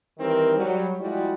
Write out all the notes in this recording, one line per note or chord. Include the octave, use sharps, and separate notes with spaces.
D#3 E3 G3 C4 D#4 A#4
F#3 G3
F3 G3 G#3 E4 F#4 G4